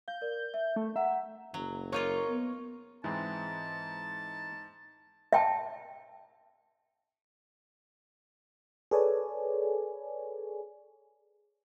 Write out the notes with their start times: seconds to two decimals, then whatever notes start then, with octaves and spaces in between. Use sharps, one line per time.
0.08 F5 G6
0.22 A#4 D5
0.54 E5
0.76 A3
0.96 E5 F#5 A#5
1.54 F#1 F#3
1.92 A#3 D#4 F4 A#4 C#5 C#6
2.28 B3
3.04 G#2 E3 G#3 C4 A5
5.33 E5 G5 A5
8.91 G#4 A4 B4 C#5 D5 G#5